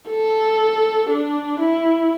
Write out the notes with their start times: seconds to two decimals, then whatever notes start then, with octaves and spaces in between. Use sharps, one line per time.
0.10 A4
1.10 D4
1.60 E4